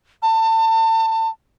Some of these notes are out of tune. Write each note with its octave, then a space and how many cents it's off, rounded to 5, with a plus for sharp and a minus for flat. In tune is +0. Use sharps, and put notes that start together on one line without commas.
A5 +30